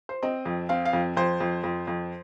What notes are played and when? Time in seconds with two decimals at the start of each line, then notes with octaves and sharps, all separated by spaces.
0.09 C5
0.23 C4 D#5
0.45 F2
0.69 C4 F5
0.85 F5
0.93 F2
1.17 F2 C5
1.40 F2
1.64 F2
1.87 F2